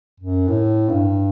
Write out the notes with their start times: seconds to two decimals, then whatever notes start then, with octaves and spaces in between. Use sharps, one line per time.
0.20 F#2
0.48 A2
0.89 G2